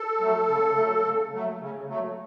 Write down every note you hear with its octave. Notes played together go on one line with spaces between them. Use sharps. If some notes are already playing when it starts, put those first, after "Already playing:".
Already playing: A4
F#3 A3
C#3
F#3 A3
C#3
F#3 A3
C#3
F#3 A3